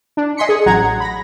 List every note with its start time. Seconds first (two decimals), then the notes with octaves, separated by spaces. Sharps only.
0.17 D4
0.37 D#5 G#5 C6 B6 C#7
0.49 G#4
0.66 A1 F#3 F#5 A#5 G#6
1.00 B5 A#6